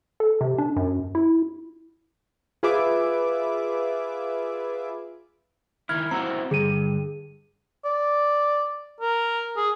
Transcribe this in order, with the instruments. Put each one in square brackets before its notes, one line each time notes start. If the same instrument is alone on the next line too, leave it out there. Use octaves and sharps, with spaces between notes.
[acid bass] A4
C3
D4
F#2
E4
[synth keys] F4 G#4 B4 E5 D6
[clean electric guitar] D#3 E4 [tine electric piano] F6 G#6
[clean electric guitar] C4 E4 F#4 [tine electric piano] A#5
[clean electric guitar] G2 [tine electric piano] D3 [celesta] G#4 D#7
[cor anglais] D5
A#4
G#4